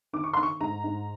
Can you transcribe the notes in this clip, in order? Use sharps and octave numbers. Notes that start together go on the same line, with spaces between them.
D#3 D6
C#6
D#3 C6
C#6
G#2 A#5
G#2